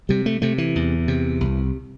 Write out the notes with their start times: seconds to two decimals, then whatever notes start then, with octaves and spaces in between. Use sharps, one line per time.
0.09 C3 G3
0.26 A3
0.42 C3 A3
0.58 E3
0.76 E2
1.08 C3
1.41 C2